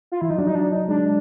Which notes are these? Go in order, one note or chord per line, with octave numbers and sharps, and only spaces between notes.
F4
E3 E4
F3 D#4
F#3 D4
D#4
D4
D#4
G#3 D4